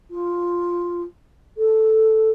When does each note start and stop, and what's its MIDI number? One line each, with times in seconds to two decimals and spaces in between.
0.10 1.02 65
1.57 2.31 69